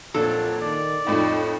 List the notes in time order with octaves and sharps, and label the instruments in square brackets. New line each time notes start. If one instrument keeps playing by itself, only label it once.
[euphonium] F2 [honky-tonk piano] A#2 D4 [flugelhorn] F#3 [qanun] A4
[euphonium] D#3 [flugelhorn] D5
[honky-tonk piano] F2 A2 F3 [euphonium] D#4